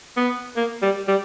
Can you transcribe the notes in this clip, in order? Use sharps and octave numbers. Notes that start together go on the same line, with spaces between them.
B3
A#3
G3
G3